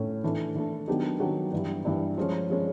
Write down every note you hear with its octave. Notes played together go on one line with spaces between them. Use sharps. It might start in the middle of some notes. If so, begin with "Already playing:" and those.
Already playing: A2 C#4
E3 A3 D4
E3 A3 D4
D#3 F#3 B3 D4 G4
D#3 F#3 B3 D4 G4
G2 E3 G3
G2 E3 G3
F3 G#3 C#4
F3 G#3 C#4